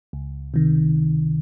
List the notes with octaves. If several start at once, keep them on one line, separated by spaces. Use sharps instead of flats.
C#2
C3 D#3